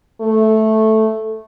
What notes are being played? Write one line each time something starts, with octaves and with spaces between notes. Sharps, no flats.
A3